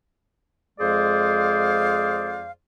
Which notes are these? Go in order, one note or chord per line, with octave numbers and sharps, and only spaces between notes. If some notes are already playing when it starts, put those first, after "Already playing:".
F2 G#3 G#4 C5 D5 F5